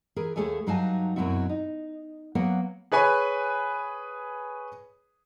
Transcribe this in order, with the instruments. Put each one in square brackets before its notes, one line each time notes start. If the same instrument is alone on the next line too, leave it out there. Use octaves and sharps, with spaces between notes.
[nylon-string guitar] E3 G#4 A#4
D#2 A3 G#4 A4 C#5 G#5
G2 F#3 D#4 F5 G#5 A5
F#2 B2 F#3 C4 E4 F#4
D#4
F#3 A#3 B3 F#5
[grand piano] G#4 B4 C#5 G#5 B5